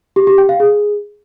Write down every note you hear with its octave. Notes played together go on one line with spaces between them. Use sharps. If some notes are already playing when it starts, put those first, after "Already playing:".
G4
G4
G5
F5
G#4